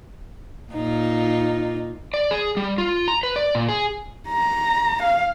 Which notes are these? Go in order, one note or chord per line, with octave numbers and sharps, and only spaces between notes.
A#2 D#4 F4
D5
G#4
G3
F4
A#5
B4
D5
A#2
G#4
A#5
F5